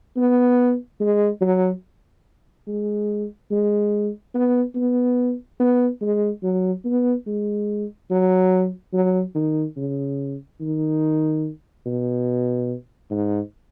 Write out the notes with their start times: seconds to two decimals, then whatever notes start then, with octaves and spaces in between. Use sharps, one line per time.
0.17 B3
1.00 G#3
1.41 F#3
2.67 G#3
3.51 G#3
4.34 B3
4.75 B3
5.60 B3
6.01 G#3
6.43 F#3
6.85 B3
7.27 G#3
8.10 F#3
8.93 F#3
9.35 D#3
9.77 C#3
10.61 D#3
11.86 B2
13.11 G#2